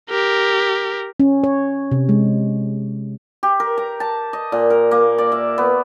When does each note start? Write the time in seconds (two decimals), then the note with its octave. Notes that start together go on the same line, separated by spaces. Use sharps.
0.10 G4 A#4
1.20 C#4
1.44 C#5
1.92 C3
2.09 G#3
3.43 G4
3.60 A#4
3.78 A#5
4.00 A5
4.33 D#5
4.52 A#2
4.70 A#4
4.91 A#3
5.18 D5
5.32 E5
5.58 B3